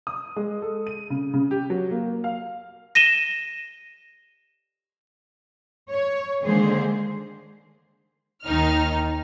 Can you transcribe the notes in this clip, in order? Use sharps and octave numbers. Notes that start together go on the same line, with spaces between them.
D#6
G#3
A4
D#7
C#3
C#3
G4
F#3
A#3
F5
A#6 D#7 E7 G7
C#5
D3 D#3 G#3 A#3 G#4 C5
D#2 D#3 D#4 F6